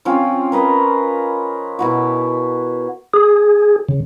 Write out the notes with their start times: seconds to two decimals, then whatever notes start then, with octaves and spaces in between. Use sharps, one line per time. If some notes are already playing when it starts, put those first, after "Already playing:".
0.05 F3 C4 C#4 F4
0.52 A#4 B4 D#5
1.79 B2 E4 F#4
3.14 G#4
3.89 C#3